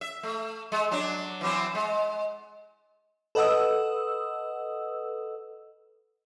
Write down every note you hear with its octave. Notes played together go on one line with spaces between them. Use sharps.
E5
A3
G#3
F#3 D4
E3 F#3 C4
G#3
A4 B4 D#5 F#5 D#6 E6